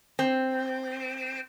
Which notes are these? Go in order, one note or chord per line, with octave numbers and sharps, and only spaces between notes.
C4